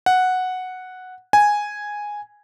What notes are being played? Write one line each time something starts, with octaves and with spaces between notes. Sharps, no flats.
F#5
G#5